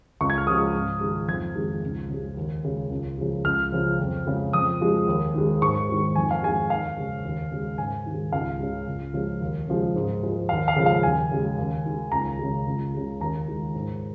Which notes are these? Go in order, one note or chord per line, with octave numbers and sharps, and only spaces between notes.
C#2 C#6
G#6
F6
C#3 F3 G#3 D#6
G#2
D#3 G#3
F2 G#6
D#3 G#3
C#2
C#3 G#3
D#2
C#3 G#3
C#2
C#3 F3 G#3
C#2 F6
C#3 F3
F2
C#3 G#3
F2 D#6
F3 G#3
D#2
D#3 G#3
G#2 C#6
D#3 G#3
F2 G#5
F5
D#3 G#3 G#5
D#2 F5
C#3 G#3
D#2
C#3 G#3
G#2 G#5
D#3 G#3
C#2 F5
C#3 G#3
C#2
C#3 F3 G#3
D#2
C#3 F3 G#3
G#2
F3 G#3
D#2 F5
F5
C#3 F3 G#3
F5
D#2 G#5
C#3 G#3
D#2
D#3 G#3
C#2 A#5
C#3 G#3
C#2
C#3 G#3
D#2 A#5
D#3 G#3
G#2